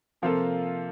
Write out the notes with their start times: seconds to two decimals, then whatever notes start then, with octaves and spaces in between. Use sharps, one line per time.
0.22 C3 F3 A#3 F4 A4